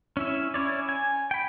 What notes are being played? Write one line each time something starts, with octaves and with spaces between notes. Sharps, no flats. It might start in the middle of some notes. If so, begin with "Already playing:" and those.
C#4 E4 E5
C#4 E4 C#5 D5
G#5
G5 B5